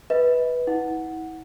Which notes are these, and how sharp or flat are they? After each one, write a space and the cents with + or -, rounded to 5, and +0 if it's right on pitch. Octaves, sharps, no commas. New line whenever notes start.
B4 +0 D#5 +45
E4 -40 F#5 +0